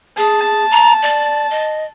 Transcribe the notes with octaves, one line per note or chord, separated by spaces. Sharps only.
G#4 A5
A#5
D5
D#5